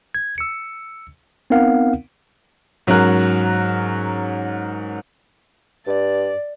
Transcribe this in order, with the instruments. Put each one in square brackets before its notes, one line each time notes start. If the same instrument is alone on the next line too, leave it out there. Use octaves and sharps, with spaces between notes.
[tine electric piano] G#6
E6 C#7
B3 C4 D#4 A#4 F5 F#5
[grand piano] G#2 F#3 C#4 F#4 A#4 F#6
[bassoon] G2 [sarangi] D5